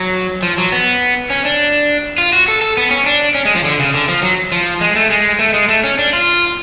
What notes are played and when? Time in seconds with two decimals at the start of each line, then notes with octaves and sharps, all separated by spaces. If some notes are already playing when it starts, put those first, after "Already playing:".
Already playing: F#3
0.43 F3
0.58 F#3
0.72 B3
1.30 C#4
1.45 D4
2.18 F4
2.33 F#4
2.48 A4
2.62 A4
2.77 B3
2.91 C#4
3.06 D4
3.35 C#4
3.45 G#3
3.55 F3
3.64 D3
3.79 C#3
3.94 D3
4.09 F3
4.23 F#3
4.52 F3
4.81 G#3
4.96 A3
5.10 G#3
5.39 A3
5.54 G#3
5.69 A3
5.84 C#4
5.99 D4
6.13 F4